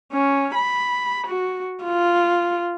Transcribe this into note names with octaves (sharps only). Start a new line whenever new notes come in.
C#4
B5
F#4
F4